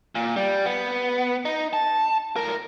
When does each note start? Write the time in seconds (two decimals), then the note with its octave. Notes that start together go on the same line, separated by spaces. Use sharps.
0.15 A#2
0.36 G3
0.66 B3
1.45 D#4
1.73 A5
2.36 A2 A#4